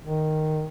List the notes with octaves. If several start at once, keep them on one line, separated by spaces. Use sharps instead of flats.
D#3